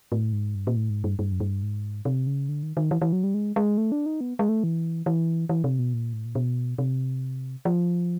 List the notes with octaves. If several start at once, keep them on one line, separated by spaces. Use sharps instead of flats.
A2
G#2
G2
A#2
A2
G#2
G2
G2
F#2
G2
G#2
C3
C#3
D3
D#3
D#3
E3
E3
F#3
G3
G#3
G#3
A3
D4
D#4
B3
G#3
A3
E3
E3
E3
C3
B2
A#2
A2
A#2
B2
C3
F3